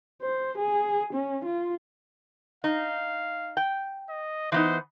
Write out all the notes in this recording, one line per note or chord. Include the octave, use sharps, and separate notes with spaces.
C5
G#4
C#4
F4
D#4 F5
G5
D#5
E3 B3 D#4 C5